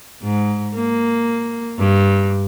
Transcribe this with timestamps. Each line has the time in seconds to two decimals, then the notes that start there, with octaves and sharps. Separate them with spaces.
0.22 G#2
0.75 A#3
1.79 G2